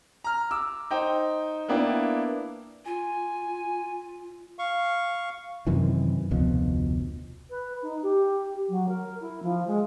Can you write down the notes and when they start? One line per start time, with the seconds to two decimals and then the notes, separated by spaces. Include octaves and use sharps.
0.24 A#5 F6
0.51 D6 E6
0.91 D#4 C5 G5
1.68 A#3 B3 D4 E4 G5
2.85 F4 G#5
4.59 F5 C#6
5.67 F#2 C3 D#3 E3
6.31 F1 D2 B2 F3
7.50 B4
7.82 D#4
8.02 G4
8.69 F#3
8.88 A#4
9.21 E4
9.42 F3
9.66 G#3